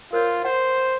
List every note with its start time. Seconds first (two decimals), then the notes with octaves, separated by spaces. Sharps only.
0.13 F4 A#4 C5 C#5
0.45 C5 F#5